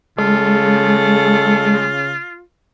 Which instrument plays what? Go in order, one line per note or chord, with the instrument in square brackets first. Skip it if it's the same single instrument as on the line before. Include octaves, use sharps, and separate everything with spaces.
[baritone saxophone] C#3 [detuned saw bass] G#3 [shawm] F4 [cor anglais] A4